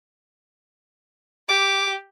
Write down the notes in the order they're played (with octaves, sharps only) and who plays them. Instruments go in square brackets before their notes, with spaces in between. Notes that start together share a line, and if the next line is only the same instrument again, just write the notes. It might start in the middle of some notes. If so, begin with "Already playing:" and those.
[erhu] G4 [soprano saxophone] D6